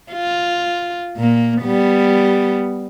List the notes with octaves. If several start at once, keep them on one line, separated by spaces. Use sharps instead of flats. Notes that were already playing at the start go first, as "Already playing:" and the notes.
F4
A#2 A#3
G3 B3